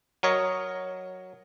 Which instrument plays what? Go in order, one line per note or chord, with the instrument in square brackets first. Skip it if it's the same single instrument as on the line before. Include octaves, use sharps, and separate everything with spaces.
[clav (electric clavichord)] F#3 A#4 C#5 D#5